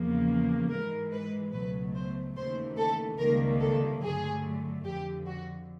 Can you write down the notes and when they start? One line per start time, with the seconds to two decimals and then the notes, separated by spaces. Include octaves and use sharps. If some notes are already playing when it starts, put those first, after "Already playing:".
Already playing: E2 C#3 F3 A#3
0.70 G#2 E3 G#3 A#4
1.11 B4
1.53 C#2 B2 F#3 A3 B4
1.95 C5
2.36 D#2 C#3 E3 A3 C5
2.77 A4
3.19 C#2 C3 D#3 G3 A#3 A#4
3.60 A4
4.02 G2 D3 F#3 A3 G#4
4.84 F2 D3 F3 G4
5.26 F#4